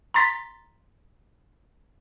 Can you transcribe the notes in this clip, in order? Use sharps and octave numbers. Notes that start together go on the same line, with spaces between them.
A#5 C6 A6 B6